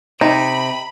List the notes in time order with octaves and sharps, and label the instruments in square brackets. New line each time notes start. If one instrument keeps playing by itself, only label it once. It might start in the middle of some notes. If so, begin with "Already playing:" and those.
[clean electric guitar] C3 [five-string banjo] D#4 [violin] B5